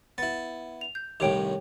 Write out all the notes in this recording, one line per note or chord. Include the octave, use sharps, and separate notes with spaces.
B3 E4 A6
F7
G6
C2 A2 D#3 G4 C#5 G5